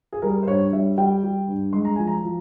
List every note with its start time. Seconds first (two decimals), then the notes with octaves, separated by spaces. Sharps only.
0.13 G#4
0.22 G3 A#4
0.43 C5
0.47 G2 C#5
0.72 G3 E5
0.98 G3 G5
1.23 G3
1.48 G2
1.73 G#3 C6
1.85 A#5
1.96 F3 G#5
2.07 A#5
2.24 F3